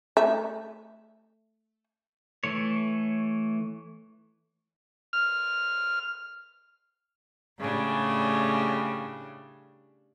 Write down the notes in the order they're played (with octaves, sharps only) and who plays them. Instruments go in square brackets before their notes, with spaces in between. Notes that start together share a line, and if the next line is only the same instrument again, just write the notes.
[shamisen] A3 E5
[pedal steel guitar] E3 A3 C#5
[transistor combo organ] F6
[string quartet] A2 C#3 G3 D4